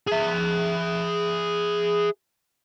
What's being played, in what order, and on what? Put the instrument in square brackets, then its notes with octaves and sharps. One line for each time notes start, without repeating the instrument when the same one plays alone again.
[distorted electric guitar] G#4 E5